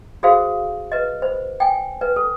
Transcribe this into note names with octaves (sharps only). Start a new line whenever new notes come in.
F#4 G#4 A4 C5 F5
B4 D#5
C5
G5 G#5
B4
A4